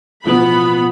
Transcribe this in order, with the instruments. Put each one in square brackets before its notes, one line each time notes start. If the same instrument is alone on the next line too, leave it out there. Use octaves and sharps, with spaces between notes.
[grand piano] A1 B2 F3 [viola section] B3 B5